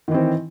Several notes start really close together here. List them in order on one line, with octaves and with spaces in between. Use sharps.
D#3 E3 C4